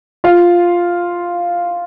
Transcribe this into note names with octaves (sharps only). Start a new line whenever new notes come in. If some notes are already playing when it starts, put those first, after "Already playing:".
F4 F5